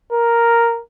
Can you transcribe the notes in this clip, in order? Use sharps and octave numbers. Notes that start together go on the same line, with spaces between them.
A#4